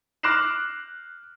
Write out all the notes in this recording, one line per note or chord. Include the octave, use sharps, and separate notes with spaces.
D6 F6 F#6 A#6 C7 E7